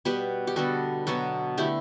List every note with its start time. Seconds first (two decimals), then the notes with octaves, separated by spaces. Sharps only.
0.05 B2 G3 B3 G4 B4
0.47 G4
0.56 D3 G3 B3 F#4 A4
1.07 B2 F#3 B3 F#4 A4
1.58 D3 A3 E4 G4